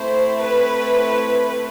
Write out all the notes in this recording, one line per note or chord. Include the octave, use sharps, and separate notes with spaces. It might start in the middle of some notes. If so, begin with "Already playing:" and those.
Already playing: A3 C4 E4 C5
B4